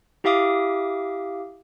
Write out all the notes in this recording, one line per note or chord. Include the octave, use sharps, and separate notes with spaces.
E4 G4 E5 F5 D6 D#6